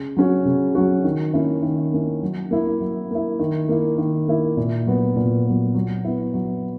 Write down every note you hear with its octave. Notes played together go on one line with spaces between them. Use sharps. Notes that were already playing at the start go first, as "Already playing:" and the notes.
Already playing: C#3
F#3 C#4 F#4
C#3
F#3 C#4 F#4
D#3
A#3 C#4 E4
D#3
A#3 C#4 E4
F#3
A#3 E4
F#3
A#3 E4
D#3
A#3 E4
D#3
A#3 E4
A#2
F#3 B3
A#2
F#3 B3
F#3
B3 E4
F#3